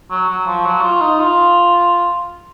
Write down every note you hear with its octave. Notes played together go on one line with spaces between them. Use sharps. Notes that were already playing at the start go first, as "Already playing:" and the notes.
F#3
F#3
F3
F#3
F4
D#4
F4